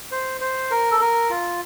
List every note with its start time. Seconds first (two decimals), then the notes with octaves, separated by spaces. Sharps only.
0.12 C5
0.41 C5
0.71 A#4
0.91 A4
1.00 A#4
1.30 F4